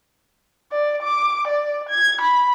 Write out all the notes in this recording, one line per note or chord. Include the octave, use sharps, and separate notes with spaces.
D5
D6
D5
G#6
B5